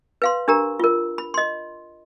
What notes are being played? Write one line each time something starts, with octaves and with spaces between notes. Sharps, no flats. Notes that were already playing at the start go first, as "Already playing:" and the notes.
B4 F5 C6
D4 G4 A#4 A#5
F4 A#4
B5
D#5 C6